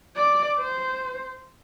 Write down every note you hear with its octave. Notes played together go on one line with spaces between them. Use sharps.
D5
C5